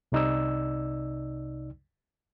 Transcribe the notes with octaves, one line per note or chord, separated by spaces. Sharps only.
C2 C3 D#4 D5 E6